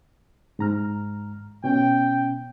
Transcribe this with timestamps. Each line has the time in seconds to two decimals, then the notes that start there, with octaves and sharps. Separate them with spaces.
0.59 G#2 A#5 F6
1.64 B2 C#4 G5